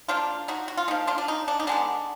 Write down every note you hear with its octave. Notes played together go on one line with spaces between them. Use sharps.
F3 A#3 D4 F4
D#4 F#4
F#4
F4
F3 A#3 D#4
D4 F4
D4
D#4
D4
D#4
D3 G#3 B3 D4